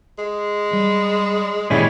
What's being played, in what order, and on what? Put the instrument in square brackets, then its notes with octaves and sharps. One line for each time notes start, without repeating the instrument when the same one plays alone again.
[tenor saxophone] G#3
[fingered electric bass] G3
[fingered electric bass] A1 A#2 D#3 [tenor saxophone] G3 [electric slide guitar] G#3 C#4 E4